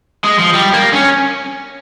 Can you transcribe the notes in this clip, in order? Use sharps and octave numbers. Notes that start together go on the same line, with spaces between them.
G#3
F3
G3
A#3
C#4